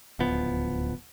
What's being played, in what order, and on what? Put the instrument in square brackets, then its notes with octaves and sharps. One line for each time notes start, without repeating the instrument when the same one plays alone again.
[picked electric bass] D1 C#2 F3 B3